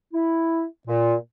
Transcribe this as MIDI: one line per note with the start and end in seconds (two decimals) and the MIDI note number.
0.14 0.65 64
0.88 1.15 46